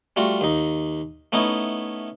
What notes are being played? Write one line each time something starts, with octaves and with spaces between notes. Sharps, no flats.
G3 A3 F4 F#4
D#2 D#4
A3 B3 C#4 D#4 E4